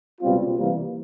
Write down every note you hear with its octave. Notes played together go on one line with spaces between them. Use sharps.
C#2 B2 G3 C4 F4
C3 E3 G3 A#3